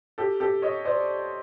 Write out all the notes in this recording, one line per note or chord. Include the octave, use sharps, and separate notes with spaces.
G4 A4
G4 A4
C#5 D#5
C5 D5